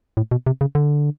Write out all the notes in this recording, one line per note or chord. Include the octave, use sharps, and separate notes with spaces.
A2
B2
C3
C#3
D3